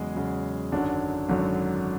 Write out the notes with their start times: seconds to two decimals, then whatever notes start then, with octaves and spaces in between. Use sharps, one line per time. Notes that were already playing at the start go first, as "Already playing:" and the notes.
Already playing: E2 C#3 F#3 G#3 G#4
0.15 E2 C#3 F#3
0.72 G#1 F#2 D3 F#3 D4
1.29 G#1 F#2 D3 F#3